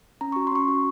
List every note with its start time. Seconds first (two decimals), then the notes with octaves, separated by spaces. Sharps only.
0.21 C#4 A#5
0.32 F#4 C#6
0.47 C6
0.52 C#4 C#6
0.68 F#4